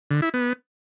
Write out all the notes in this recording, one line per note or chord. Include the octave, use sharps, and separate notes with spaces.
D3
E4
B3